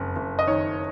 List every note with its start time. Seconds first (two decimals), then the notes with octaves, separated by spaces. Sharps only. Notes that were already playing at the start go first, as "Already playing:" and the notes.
Already playing: F#1 F2
0.16 F#1
0.39 D#5
0.47 D#3 C#5